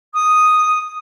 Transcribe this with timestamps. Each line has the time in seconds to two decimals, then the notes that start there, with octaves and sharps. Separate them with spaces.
0.14 D#6